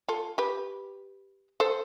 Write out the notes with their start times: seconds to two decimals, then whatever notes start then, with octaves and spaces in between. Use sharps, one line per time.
0.08 F4 A4
0.38 G4 B4
1.60 A4 C5